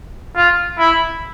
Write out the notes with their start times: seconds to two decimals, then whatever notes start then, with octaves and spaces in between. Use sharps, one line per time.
0.36 F4
0.78 E4